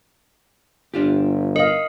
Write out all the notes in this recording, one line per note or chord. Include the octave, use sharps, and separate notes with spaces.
G1 D4 F4 G4
A#4 D#5 F5